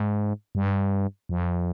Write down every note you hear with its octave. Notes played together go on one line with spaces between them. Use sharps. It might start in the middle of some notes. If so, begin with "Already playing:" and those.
Already playing: G#2
G2
F2